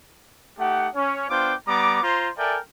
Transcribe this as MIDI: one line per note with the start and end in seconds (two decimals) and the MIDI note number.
0.59 0.89 57
0.59 0.89 63
0.59 0.89 67
0.59 0.89 78
0.95 1.29 61
0.95 1.29 73
1.30 1.54 59
1.30 1.54 62
1.30 1.54 65
1.30 1.54 72
1.30 1.54 79
1.30 1.54 86
1.67 1.99 55
1.67 1.99 59
1.67 1.99 82
1.67 1.99 86
2.03 2.30 65
2.03 2.30 72
2.03 2.30 82
2.03 2.30 84
2.37 2.58 69
2.37 2.58 70
2.37 2.58 74
2.37 2.58 76
2.37 2.58 79
2.37 2.58 80